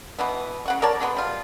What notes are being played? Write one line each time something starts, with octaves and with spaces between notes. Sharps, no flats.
B2 E3 B3
C#3 F#5 C#6
A#4 C#5 D5 A5
F#3 G#3 B3
G3 F4